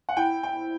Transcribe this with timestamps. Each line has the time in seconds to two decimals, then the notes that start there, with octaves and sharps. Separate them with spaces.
0.09 F#5
0.17 E4 G5
0.43 G5